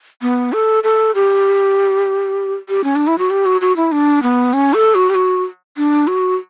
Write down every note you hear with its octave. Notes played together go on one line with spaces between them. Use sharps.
B3
A4
A4
G4
G4
C#4
D4
E4
F#4
G4
F#4
F#4
E4
D4
B3
C#4
A4
F#4
G4
F#4
D4
F#4